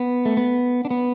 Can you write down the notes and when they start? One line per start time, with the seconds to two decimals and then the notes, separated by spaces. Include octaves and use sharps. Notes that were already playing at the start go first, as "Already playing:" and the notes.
Already playing: B3
0.25 A3
0.37 B3
0.85 D4
0.91 B3